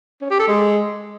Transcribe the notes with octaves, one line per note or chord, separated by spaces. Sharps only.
C#4
G4
A4
G#3